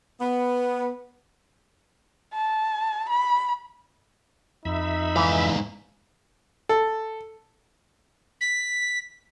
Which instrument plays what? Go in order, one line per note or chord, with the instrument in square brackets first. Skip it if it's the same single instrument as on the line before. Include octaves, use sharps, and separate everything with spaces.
[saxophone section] B3
[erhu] A5
B5
[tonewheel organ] F2 E5 B5 [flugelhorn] D#4
[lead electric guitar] G#2 F5 [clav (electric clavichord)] E3 D#5
[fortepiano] A4
[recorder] B6